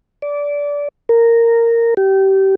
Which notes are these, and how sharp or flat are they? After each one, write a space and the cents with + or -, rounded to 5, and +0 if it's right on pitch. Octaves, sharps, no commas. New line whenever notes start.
D5 -20
A#4 -10
G4 -25